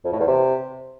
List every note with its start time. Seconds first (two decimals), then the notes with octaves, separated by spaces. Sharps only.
0.05 F2
0.12 A2
0.20 E2
0.28 C3